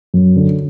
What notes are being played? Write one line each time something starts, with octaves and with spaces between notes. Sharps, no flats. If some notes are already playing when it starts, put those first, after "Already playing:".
F#2
D3